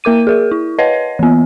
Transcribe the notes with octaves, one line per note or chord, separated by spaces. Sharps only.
A#3 A#4 D6 D#7
G#4 A#4
E4
B4 C#5 D#5 F#5
E3 B3